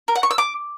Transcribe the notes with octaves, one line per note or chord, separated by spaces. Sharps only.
A#4
F#5
C#6
E6
D6